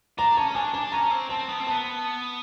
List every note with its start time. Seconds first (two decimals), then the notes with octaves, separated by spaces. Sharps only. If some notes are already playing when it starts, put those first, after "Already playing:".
0.18 D4 A#5
0.37 C#4 A5
0.55 D4 G#5
0.74 D4 A5
0.92 C#4 A#5
1.11 C4
1.29 C4 A5
1.49 B3
1.60 C4
1.67 B3 A5